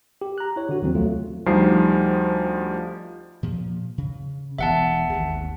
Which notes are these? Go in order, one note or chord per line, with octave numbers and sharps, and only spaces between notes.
G4
A#5 F#6
E4 C#5
D3 F#4
D#2 F3 F#3 C4
C2 F#3 A3 F4
D2 F3 G3 D#4 C7
A#2 F3
C#3
E1 E3 B3 E5 F#5 A5
G#1 D#2